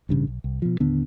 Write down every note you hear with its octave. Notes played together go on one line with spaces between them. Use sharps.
A1 G2 C#3
B1
C2
B2 F3
D#2 A2 D3 B3